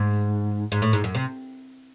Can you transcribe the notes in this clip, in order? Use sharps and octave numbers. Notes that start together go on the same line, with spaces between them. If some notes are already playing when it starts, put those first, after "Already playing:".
Already playing: G#2
G#2
A2
G#2
F#2
C3